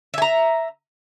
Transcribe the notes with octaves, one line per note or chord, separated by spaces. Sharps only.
E5 G#5 A#5